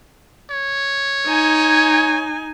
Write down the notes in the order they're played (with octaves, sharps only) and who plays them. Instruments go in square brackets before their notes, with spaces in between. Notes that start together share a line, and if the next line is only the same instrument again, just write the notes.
[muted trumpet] C#5
[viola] D#4 G#5